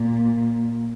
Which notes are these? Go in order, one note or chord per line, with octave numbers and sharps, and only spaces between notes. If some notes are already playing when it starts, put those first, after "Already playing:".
Already playing: A#2